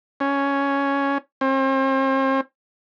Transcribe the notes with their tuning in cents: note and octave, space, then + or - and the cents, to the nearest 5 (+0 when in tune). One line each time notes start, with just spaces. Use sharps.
C#4 +5
C4 +40